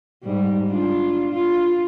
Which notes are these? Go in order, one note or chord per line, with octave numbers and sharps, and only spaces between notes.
G#2 G3
D4 F4
F4